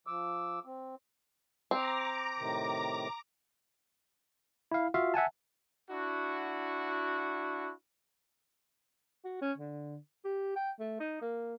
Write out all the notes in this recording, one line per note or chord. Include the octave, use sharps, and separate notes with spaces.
F3 D6 E6
C4
C4 A#5 D6
A2 C3 D#3
E4 F5
F4 F#4 E5 F5
E5 F#5 G#5 A5
D4 E4 F#4
F#4
C#4
D3
G4
G5
A3
D#4
A#3